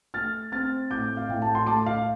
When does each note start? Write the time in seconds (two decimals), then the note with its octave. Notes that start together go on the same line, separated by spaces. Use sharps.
0.14 A3 F6 A6
0.52 C4 F6 A6
0.91 A2 D6 G6
1.17 F5
1.28 A2 G5
1.42 A5
1.55 C6
1.66 A3 A5 D6
1.86 F5